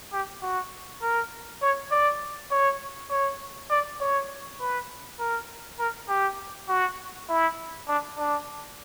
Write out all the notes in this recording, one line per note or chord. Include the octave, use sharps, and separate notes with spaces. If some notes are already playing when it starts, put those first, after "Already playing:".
G4
F#4
A#4
C#5
D5
C#5
C#5
D5
C#5
B4
A#4
A#4
G4
F#4
E4
D4
D4